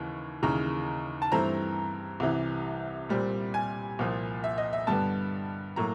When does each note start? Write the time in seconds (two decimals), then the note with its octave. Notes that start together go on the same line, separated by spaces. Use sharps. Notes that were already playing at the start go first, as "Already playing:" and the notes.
Already playing: D#2 C#3 E3
0.43 D#2 C#3 E3 A#5
1.22 A5
1.32 G2 E3 A3 C4 A#5
2.20 C2 C3 E3
3.09 A#2 G3 C4
3.54 G#5
3.99 C2 A#2 F3
4.44 E5
4.58 D#5
4.73 E5
4.87 G2 D3 G3 B3 A5
5.76 A2 F#3 A#3 A#5